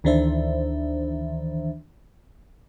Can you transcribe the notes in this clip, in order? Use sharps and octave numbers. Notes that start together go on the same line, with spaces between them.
D2 D#3 E3 D4 C5 E5